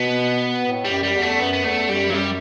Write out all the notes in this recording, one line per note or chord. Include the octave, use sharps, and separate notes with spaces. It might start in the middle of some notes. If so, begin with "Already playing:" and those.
Already playing: B2 B3
A2
G3
F#2
G3
E2
A3
F#2 B3
B3
E2 A3
F#2 G3
G2 F#3
F#2 G3